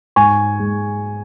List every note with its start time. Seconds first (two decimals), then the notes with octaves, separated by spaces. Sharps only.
0.16 G#2 G#5 C#6
0.59 G#3